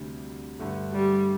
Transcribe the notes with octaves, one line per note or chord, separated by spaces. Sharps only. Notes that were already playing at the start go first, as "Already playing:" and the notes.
Already playing: D2 C3 G3 D4
G2 D3 A3
G3